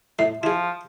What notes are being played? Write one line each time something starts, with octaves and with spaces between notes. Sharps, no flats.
A2 E5
F3 E4 G#4